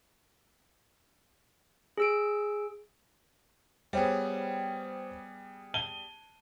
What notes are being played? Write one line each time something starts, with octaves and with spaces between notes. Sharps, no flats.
G#4 E6 D7
G3 B3 G#4 C5 C#5 G5
A5 D#7 G7